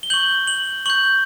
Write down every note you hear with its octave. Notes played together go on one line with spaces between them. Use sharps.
G7
C#6 G6 F#7
F#7
C#6 G6 F#7